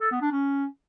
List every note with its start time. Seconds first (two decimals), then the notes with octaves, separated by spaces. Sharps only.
0.01 A4
0.11 B3
0.21 D4
0.32 C#4